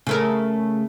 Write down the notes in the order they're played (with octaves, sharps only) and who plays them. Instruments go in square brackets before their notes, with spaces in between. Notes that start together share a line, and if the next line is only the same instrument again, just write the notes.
[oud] C#3 A3 A#4